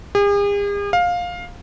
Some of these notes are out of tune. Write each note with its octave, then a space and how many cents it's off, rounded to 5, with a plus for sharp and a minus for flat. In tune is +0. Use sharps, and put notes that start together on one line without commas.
G#4 -45
F5 +15